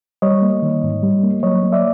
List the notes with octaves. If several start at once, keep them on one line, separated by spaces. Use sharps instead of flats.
G3 C#5 D#5
A#3
D#3
G#2
G3
A#3
F#3 C#5 D#5
A#3
D5 E5